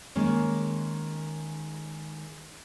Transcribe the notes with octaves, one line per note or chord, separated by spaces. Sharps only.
D#3 G#3 A#3 C#4